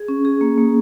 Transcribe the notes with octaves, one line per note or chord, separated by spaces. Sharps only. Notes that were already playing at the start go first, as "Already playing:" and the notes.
Already playing: G#4
C#4
G#4
A#3
A#3